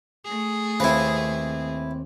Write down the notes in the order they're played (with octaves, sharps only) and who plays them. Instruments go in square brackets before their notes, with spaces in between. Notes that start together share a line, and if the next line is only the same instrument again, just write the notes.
[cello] A3 G#4
[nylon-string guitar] D#2 C4 F5 [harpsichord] E4 B4